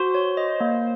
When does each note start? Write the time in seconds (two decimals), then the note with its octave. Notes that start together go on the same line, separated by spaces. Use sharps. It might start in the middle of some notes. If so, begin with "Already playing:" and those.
Already playing: F#4 C5
0.15 C#5
0.37 D#5
0.60 A#3